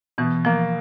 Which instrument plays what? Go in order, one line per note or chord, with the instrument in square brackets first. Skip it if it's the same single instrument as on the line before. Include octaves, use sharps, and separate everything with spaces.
[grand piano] B2 [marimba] E3
[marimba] F3 [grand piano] A#3